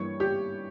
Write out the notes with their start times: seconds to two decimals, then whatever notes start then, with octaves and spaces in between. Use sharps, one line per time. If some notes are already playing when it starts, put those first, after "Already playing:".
Already playing: G2 E3 G3 A#3 C#5
0.20 G4